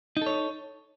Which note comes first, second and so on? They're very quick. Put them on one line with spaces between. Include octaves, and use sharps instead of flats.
D#4 A4 C#5